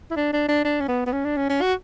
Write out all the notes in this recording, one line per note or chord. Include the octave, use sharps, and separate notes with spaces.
E4
D4
D4
D4
D4
C#4
B3
B3
C#4
D4
C#4
C#4
F#4